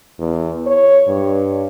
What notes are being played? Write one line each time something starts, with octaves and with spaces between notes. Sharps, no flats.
E2
C#5
G2